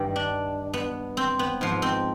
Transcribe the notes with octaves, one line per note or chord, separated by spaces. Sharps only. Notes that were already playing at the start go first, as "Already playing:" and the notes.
Already playing: G2 D#3 G3
D4
B3
C4
B3
G#2 F3
C4